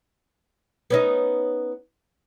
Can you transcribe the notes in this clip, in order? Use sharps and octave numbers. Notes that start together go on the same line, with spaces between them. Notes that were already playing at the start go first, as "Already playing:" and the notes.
B3 C#4 D#4